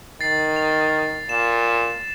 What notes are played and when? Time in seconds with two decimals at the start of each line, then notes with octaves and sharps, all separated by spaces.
0.21 D#3 A6 C7
0.56 F7
1.29 A#2 E7